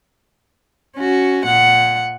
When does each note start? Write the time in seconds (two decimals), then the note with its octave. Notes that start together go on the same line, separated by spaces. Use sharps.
0.97 C#4 F#4
1.45 A#2 F#5